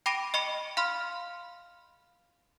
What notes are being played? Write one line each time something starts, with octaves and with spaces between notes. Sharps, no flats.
G5 B5 D6 A#6 D7 D#7
D#5 B5 C#6 C#7
F5 B5 C6 F6